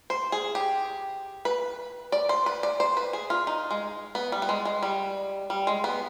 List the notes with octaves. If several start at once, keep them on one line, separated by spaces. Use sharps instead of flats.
C5
G#4
G4
B4
D5
C5
B4
D5
C5
B4
G#4
F4
D#4
G#3
B3
G3
B3
G#3
G#3
G3
G3
G#3
B3